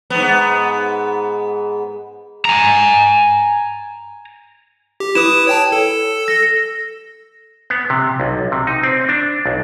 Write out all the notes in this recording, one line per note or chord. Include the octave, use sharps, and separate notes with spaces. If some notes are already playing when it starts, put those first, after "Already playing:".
G#2 B3
G#5 A#5
G4
E4 B4 D#6 E7
C#5 G5 A5
A4
A#6
B3
C3
B1
C3
D#4
C4
D4
B1